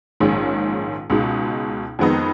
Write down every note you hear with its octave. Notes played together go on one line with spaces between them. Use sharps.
A#1 G#2 D#3 G#3 C#4
C#2 B2 G#3 D#4
F2 D#3 G#3 B3 D#4